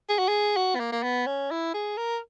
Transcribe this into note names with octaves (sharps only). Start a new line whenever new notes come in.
G#4
F#4
G#4
F#4
B3
A#3
A#3
B3
C#4
E4
G#4
A#4